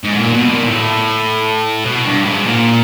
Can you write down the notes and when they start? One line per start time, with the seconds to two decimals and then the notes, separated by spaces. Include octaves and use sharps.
0.04 G#2
0.14 B2
0.19 A#2
0.34 B2
0.49 A#2
0.64 A2
1.85 B2
2.05 G2
2.25 G#2
2.46 A#2